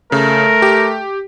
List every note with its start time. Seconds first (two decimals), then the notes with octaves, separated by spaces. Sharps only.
0.12 C#3 A3 A#4
0.62 G4